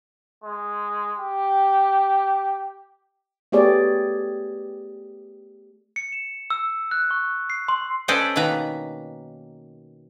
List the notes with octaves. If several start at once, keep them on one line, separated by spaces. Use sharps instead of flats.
G#3
G4
A3 B3 G4 G#4 C#5 D5
C#7
E7
E6
F#6
C#6
C7
C6
C#4 A4 B4 C5 D5 D#5
B2 D#3 A#3 B4 A#5